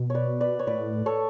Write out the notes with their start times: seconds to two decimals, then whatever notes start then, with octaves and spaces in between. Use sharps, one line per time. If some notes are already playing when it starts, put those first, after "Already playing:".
Already playing: B2
0.10 B4 C#5 D5
0.41 B4 D5
0.59 C#5
0.67 A2 B4 D5
1.06 A4 C#5